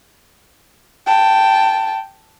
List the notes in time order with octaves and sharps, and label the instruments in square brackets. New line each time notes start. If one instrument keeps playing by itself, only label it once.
[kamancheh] G5 A5